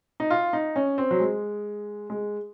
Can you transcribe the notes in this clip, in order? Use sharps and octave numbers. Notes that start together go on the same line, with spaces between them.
D#4
F4
D#4
C#4
C4
F#3
G#3
G#3